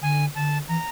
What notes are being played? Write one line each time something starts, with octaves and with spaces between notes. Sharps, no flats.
D3 G#5
D3 A5
E3 A#5